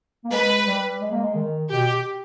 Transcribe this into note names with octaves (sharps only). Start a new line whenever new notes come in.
A#3
G#3 B4
G3
G#3
A#3
G#3
D#3
B2 G4